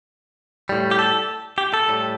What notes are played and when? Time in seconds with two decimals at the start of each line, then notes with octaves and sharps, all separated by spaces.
0.69 A2 G3
0.91 G4
0.99 A4
1.58 G4
1.74 A4
1.88 A2 G3